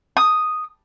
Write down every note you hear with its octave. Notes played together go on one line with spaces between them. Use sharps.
D#6